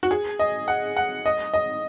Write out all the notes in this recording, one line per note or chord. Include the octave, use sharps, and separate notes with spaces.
F#4
G#4
D#5
F#5
F#5
D#5
D#5